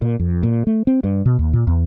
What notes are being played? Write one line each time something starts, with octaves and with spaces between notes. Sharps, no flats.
A#2
F2
A#2
A3
C4
G2
B2
D#2
A#2
E2